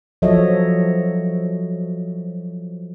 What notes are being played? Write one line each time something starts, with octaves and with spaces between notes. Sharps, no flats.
F3 F#3 A4 C#5 D#5 E5